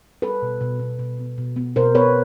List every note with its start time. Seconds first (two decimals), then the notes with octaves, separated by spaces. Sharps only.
0.22 G3 A4 B4
0.42 B2
0.61 B2
0.80 B2
0.99 B2
1.19 B3
1.38 B2
1.56 B3
1.76 B2 A#4 C5
1.95 B3 B4 C#5